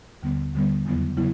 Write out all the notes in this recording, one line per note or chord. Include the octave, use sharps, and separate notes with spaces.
D#2 D3 G3 B3
D#2 D3 G3 B3
E2 C#3 F#3 B3 E4
C#3 F#3 B3 E4